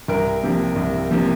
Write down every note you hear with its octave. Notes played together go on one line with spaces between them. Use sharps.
C2 A#4
C3 F3 A#3
C2
C3 F3 A#3